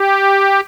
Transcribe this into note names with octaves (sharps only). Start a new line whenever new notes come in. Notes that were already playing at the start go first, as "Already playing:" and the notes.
Already playing: G4